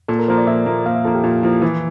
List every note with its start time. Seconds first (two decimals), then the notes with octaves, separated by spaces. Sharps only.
0.08 A#2 A4
0.19 A#4
0.28 F3 A#3 C5
0.38 D5
0.47 A#2 E5
0.66 F3 A#3
0.86 A#2 F5
0.95 E5
1.04 F3 A#3 A4
1.15 G4
1.24 A#2 F4
1.43 F3 A#3 E4
1.62 E3 E4